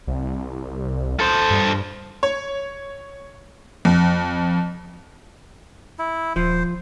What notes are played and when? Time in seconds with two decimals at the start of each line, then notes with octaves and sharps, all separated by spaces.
0.07 C2
1.20 A4 C5
1.50 G2
2.23 C#5
3.85 F2
5.99 E4
6.36 D#1 F3 C5